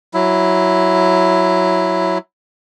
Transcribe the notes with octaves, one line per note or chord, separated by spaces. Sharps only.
F#3 E4